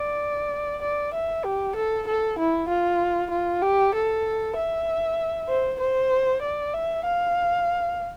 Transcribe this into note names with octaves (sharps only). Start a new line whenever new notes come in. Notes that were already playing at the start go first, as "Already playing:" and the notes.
Already playing: D5
D5
E5
G4
A4
A4
E4
F4
F4
G4
A4
E5
C5
C5
D5
E5
F5